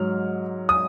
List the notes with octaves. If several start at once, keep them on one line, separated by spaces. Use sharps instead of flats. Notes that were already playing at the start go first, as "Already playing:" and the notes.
Already playing: G#2 F#3 F6
D#6